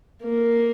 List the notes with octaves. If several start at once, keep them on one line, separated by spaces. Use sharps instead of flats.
A#3